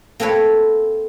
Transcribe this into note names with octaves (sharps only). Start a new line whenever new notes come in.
A#3 C4 A4 B4 C#5